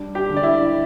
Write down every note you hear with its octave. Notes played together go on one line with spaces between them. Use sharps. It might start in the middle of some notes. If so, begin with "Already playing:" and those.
Already playing: G3 D4
G4 G5
D3
D5
E4 E5